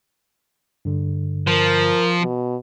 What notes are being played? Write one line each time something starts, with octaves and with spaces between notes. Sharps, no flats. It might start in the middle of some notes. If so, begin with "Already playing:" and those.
G2 D3
F3 A#4
B2